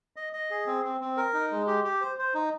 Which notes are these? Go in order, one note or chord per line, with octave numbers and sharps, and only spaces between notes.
D#5
D#5
G#4
C4
C4
C4
A#4
D#4
G#3
G4
G4
C5
C5
D#4